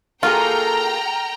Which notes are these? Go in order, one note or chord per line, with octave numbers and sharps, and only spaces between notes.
A#3 F4 F#4 G#4 A4 G5 A#5 F6